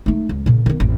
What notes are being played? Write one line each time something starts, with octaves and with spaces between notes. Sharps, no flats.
A3 D#4
C#2
A#2 C#3
D#3 B3
A1 F2